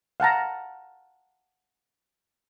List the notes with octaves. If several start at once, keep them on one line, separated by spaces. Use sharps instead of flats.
F5 F#5 A5 A#5